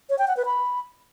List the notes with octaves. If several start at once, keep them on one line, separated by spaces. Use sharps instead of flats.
C#5
G5
F#5
B4
B5